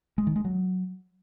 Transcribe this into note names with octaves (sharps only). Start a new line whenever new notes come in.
G#3
D#3
G#3
F#3